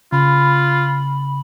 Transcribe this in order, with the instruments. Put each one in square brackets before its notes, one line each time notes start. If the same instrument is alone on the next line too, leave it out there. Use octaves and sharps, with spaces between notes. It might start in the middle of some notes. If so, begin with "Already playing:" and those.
[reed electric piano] C#3 [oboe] F4 [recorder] B5